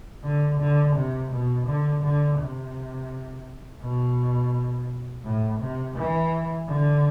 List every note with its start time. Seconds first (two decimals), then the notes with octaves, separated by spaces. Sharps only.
0.24 D3
0.60 D3
0.96 C3
1.31 B2
1.68 D3
2.03 D3
2.38 C3
3.82 B2
5.25 A2
5.60 C3
5.96 E3
6.68 D3